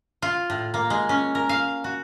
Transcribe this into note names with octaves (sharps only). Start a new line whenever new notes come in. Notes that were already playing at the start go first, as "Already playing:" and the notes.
F4
A2
A#3
G#3
C#4
A#4
F5
F#4